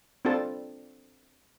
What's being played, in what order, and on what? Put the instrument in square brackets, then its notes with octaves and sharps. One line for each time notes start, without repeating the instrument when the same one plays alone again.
[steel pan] C4 D4 F4 A4 A5